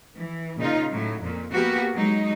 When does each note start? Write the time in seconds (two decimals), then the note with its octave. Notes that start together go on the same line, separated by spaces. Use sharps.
0.16 E3
0.57 A#2 C#3 D#4 F4
0.90 A2 F#3
1.22 F2 A#2
1.53 A#3 B3 F#4 G4
1.92 F#3 G#3 D#4